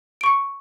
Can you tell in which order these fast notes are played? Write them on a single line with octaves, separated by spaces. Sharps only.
D7 C#6 C#7